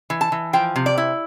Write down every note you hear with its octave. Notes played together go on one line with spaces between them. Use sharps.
E3
A5
E3
F3 G5
C3
D5
E4